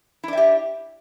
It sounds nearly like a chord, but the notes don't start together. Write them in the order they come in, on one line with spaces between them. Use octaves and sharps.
E4 D4 E5 G4